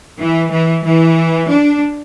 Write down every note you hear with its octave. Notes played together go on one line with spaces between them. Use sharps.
E3
E3
E3
D4